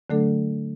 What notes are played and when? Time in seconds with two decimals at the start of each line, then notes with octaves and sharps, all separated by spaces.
0.10 D3 F#3 A3 D4 A4